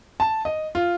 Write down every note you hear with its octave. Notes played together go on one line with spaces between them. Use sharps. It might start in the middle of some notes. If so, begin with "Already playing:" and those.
A5
D#5
F4